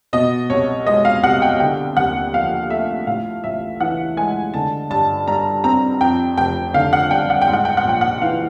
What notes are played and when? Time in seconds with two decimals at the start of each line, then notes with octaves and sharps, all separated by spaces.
0.13 B2 D#5
0.50 C2 C#5
0.86 G#3 D#5
1.05 F5
1.23 C2 F#5
1.42 G5
1.60 D3 G5
1.97 D#2 F#5
2.33 F3 F5
2.70 A3 E5
3.07 A2 F5
3.44 A1 E5
3.80 E3 F#5
4.17 G#3 G#5
4.54 D3 A5
4.90 G2 A5
5.28 G3 A#5
5.64 C4 A#5
6.00 F2 G5
6.38 F1 G5
6.74 D3 F5
6.93 F#5
7.11 G3 G5
7.30 F#5
7.42 G5
7.48 G#2
7.53 F#5
7.65 G5
7.77 F#5
7.85 A#1 G5
8.01 F#5
8.22 E3 F5